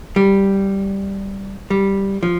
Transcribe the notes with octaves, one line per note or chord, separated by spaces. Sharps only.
G3
G3
F3